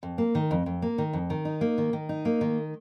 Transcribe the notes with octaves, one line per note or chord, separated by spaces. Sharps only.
F2
A#3
D#3
F2
F2
A#3
D#3
F2
D#3
D#4
A#3
D#3
D#3
D#4
A#3
D#3